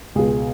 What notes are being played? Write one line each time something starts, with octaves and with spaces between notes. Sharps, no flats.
C#2 B2 G#3 G#4